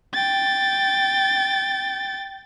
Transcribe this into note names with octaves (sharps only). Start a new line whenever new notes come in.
G5 A6